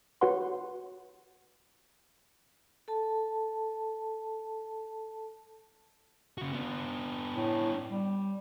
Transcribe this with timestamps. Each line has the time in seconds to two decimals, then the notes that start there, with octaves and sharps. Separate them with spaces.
0.21 F#4 B4 C#5 F#5 C6
2.88 A4 A5
6.38 C#3 F#4
6.52 B3 D4
7.35 A2
7.89 G3